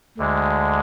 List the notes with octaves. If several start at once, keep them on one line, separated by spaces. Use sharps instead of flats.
D2 D3 G#3